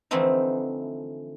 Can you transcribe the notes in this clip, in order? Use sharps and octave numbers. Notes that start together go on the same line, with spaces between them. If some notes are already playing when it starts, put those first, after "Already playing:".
D3 E3 F3 A3 C4 D#4